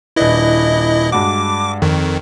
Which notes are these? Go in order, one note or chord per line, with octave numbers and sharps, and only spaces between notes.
D#1 D4 E4 B4 D#5
G2 G#3 F#4 D6
F2 D#3